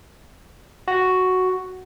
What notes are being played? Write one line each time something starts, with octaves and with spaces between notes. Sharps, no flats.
F#4